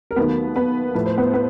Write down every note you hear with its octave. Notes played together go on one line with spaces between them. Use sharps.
A#4
D#2 D#3 F#3 A3 B3 B4
B3 B4
A2 F3 A3 B4
C5
B3 B4
B3 B4